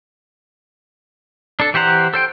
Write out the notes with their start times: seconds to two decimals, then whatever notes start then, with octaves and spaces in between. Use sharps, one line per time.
1.60 D4 A4
1.74 E3 G4 C5 F#5 A#5
2.14 A4 C5 G5